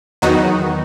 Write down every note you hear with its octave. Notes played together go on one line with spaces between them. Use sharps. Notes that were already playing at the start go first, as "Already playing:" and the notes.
E2 D#3 F#3 B3 D#4 F#4